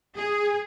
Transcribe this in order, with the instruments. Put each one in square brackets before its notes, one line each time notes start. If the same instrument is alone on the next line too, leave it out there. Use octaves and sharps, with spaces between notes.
[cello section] G#4